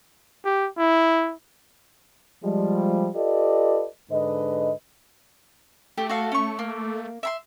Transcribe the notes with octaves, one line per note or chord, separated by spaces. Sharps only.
G4
E4
F3 G3 G#3
F4 G4 A4 B4 D5 D#5
G#2 D3 B4 D#5
A3 G4
F#4 A4 F5
C#4 C#6
A#3
E5 B5 C6